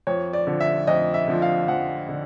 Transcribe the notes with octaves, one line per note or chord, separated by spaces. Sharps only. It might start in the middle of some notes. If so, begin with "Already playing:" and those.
F2 C#5
D5
D3 F3
E5
F2 D#5
E5
D3 F3
F5
F2 F#5
D3